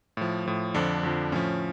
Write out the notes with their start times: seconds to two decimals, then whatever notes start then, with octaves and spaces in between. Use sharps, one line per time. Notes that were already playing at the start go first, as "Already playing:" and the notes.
0.17 A2 F3
0.46 A2 F3
0.74 F2 D3 F3 D4
1.03 F2 D3 F3
1.32 A2 F3 C#4